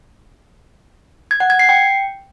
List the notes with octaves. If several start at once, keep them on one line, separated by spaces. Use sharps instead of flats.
G#6
F#5
G#6
C7
G5